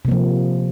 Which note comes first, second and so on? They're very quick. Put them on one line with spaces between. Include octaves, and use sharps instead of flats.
C3 A#3 F3